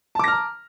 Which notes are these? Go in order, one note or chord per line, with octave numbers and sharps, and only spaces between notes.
A5 A#5 D6 F6 A#6